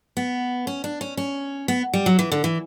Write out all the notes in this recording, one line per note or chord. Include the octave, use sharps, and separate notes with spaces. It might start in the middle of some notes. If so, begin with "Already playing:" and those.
B3
C#4
D4
C#4
C#4
B3
G3
F#3
E3
D3
E3